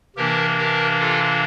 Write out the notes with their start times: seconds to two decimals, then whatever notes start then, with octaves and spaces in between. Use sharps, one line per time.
0.16 C3 E3 A#3 D4 G4 A#4
0.58 G4 A#4
1.00 F4 A4